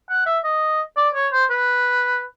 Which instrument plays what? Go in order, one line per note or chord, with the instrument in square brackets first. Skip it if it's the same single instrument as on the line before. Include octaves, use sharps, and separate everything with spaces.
[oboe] F#5
E5
D#5
D5
C#5
C5
B4